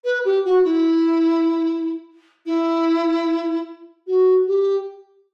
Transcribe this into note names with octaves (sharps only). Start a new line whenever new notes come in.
B4
G4
F#4
E4
E4
F#4
G4